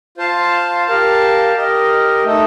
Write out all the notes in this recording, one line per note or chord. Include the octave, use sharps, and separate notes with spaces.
F4 C5 F5 A5
G4 A#4 F5 A5
G4 A#4 D#5
A3 D#4 A4